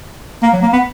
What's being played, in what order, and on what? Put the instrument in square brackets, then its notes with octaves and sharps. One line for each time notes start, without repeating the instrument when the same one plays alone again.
[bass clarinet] A#3
F#3
A#3
B3